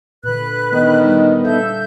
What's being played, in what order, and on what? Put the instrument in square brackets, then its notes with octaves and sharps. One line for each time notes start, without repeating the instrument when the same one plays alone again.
[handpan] A#2 D3 [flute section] B4 F#6
[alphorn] D#3 [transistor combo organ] B3 D#4 [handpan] D4 A#4
[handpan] G3
[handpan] A4 E5 F5 [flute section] G6